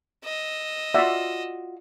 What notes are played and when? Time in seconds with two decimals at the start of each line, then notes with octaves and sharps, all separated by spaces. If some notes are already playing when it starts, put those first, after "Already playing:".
0.24 D#5 E6
0.94 F4 F#4 D5 E5 F#5